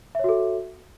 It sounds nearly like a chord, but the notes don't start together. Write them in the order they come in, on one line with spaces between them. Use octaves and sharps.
E5 C#5 F#4 A4